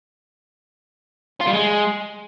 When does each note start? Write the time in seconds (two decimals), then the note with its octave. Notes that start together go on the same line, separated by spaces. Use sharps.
1.41 F4
1.47 G3
1.53 G#3